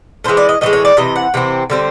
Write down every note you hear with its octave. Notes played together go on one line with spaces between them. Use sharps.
A2 E3 G#3 C5
D5
D#5
A2 E3 G#3 D#5
C#5
D5
C3 E3 D#5
F#5
C3 E3 C4
D3 G3 C4